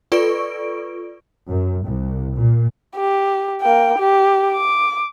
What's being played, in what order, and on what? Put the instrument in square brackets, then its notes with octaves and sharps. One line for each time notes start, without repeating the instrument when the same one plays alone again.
[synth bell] F4 A4 B4 D5 C#6 D7
[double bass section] F#2
C2
A#2
[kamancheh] G4
A#3 G5
G4
D6